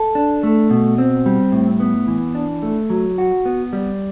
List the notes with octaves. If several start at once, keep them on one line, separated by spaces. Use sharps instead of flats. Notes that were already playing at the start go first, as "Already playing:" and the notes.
Already playing: A4
D4
A3
B2
C4
G3
A2
B3
E3
D4
A3
F#3
F#4
B3
G3